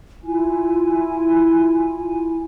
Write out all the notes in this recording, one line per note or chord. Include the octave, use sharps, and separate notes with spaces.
E4 F4 G#5